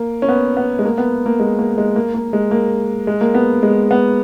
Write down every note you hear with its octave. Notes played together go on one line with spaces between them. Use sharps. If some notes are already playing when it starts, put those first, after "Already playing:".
Already playing: A#3
C#4
B3
B3
G#3
A#3
B3
A#3
G#3
A#3
G#3
A#3
A#3
G#3
A#3
G#3
A#3
B3
G#3
B3